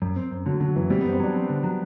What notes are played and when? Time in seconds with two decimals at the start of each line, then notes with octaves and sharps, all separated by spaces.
0.02 F#2
0.16 C4
0.31 F#2
0.46 D3 F#3
0.60 D3 F#3
0.76 F#2 E3
0.90 G3 C4
1.01 F#2 B3
1.13 C4
1.20 F#3 D4
1.34 C4
1.49 D3
1.63 F#3